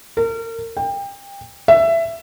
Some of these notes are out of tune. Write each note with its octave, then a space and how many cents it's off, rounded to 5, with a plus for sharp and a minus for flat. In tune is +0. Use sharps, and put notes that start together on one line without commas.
A#4 -35
G5 +25
E5 +15